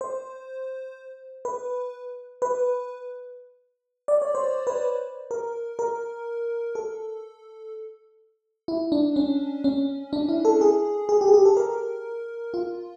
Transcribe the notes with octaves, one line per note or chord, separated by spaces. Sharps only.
C5
B4
B4
D5
C#5
C5
B4
A#4
A#4
A4
E4
D4
C#4
C#4
D4
E4
A4
G#4
G#4
G4
G#4
G4
A4
A#4
F4